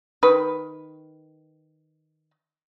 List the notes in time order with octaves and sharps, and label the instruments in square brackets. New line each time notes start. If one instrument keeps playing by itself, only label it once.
[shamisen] D#3 B4